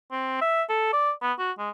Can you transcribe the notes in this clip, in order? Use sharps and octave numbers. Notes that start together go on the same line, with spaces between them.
C4
E5
A4
D5
B3
F#4
G#3